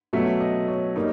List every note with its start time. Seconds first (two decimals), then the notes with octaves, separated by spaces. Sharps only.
0.13 B2 F#3 A3 C#4 E5
0.40 D#5
0.68 C#5
0.96 G3 A#3 D#4 C#5